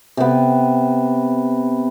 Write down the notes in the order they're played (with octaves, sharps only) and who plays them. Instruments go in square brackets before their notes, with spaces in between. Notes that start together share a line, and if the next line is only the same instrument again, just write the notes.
[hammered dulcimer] C3 B3